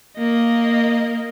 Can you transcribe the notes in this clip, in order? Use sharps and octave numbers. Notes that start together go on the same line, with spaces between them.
A#3 D#5